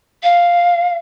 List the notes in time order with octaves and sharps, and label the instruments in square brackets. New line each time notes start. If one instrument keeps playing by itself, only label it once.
[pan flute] F5